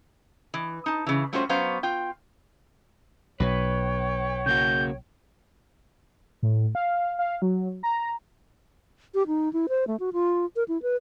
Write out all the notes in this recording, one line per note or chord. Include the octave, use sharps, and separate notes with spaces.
E3
D#4 A5
C#3 E3
G3 A3 C#4 F4 F#4 C5
F#3 B3 C#4 C5 F5
F4 G5
B1 B2 B4 C#5 G5
C#3 A#3 F#4 G6
A2
F5
F5
F#3
A#5
G4
D#4
E4
C5
A3
F#4
F4
A#4
E4
B4